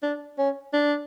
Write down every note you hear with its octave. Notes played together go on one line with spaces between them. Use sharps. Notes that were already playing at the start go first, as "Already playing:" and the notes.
D4
C#4
D4